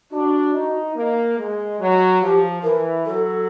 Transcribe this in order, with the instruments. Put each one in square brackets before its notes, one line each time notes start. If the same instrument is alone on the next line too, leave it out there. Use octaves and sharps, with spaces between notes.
[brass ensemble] D4 [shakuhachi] F#4
[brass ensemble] D#4
A#3
G#3
F#3
[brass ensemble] F3 [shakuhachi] G4
[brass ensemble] E3 [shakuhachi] A#4
[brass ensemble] F#3 [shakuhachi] A4